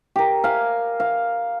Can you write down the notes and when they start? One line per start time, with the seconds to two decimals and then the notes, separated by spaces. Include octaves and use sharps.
0.16 G4 A#4
0.44 F5 G#5
1.00 F5